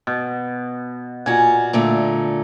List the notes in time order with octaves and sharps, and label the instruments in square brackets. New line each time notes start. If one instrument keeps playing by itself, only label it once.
[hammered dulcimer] B2
[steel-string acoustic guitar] A#2 F4 F#4 [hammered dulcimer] G#5
[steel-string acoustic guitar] A#2 D3 A3